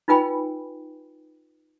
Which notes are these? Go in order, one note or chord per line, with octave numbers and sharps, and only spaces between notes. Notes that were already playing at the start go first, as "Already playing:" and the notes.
D#4 F4 B4 G5 G#5 B5